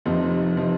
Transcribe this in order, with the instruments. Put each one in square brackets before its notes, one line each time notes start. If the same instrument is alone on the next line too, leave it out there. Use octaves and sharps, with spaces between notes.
[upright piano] F1 F2 C3 F3 D#4
C3 F3 D#4